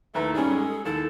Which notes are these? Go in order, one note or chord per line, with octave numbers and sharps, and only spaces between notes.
D#2 A3 E4 B4 A#5
G#2 G3 C#4 G#4 A4
G#3
D#2 E4 A4